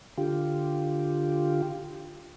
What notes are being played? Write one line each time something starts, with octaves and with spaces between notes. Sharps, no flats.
D3 F4 G4